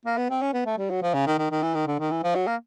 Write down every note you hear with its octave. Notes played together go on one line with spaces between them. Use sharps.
A#3
B3
C4
C#4
B3
A3
G3
F#3
F3
C#3
D#3
D#3
D#3
E3
D#3
D3
D#3
E3
F3
F#3
A#3